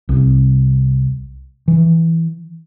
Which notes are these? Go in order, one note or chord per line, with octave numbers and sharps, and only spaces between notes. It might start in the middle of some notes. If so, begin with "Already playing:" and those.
C2
E3